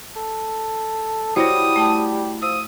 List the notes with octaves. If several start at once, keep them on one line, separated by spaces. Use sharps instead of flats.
A4
G3 E4 F#4 C5 C#5 D#6 A#6
A3 G5 A5
F3 D#6 E6